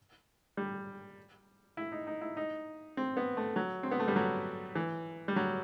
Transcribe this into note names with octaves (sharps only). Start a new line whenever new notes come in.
G3
E4
D#4
D#4
E4
D#4
C4
B3
A3
F#3
C4
B3
A3
G3
F#3
E3
G3
F#3